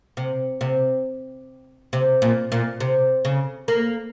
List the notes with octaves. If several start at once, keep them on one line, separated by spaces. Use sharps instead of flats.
C3
C3
C3
A#2
A#2
C3
C#3
A#3